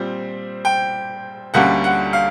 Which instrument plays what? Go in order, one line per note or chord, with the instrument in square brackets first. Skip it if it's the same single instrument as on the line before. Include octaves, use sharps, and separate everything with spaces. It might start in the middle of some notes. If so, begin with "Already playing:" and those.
Already playing: [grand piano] A#2 G3 C4
G5
D2 D3 G3 A#3 C#4 F#5
F#5
F5